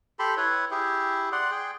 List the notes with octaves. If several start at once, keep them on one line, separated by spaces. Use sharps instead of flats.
G4 A4 B5 C6
E4 B4 C#5
E4 G4 G#4
D5 F#5 C6
G#4 G5